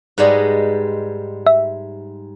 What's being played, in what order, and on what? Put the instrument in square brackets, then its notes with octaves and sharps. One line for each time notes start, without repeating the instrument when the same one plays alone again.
[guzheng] G#2 G3 G#3 [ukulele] B4 D5 D#5
[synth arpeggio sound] E5